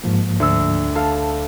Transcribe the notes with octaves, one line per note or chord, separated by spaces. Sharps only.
G#2 F3 A#3
D2 E6
A4 F5 A5